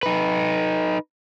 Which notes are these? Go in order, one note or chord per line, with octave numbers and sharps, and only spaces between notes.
D#4 B4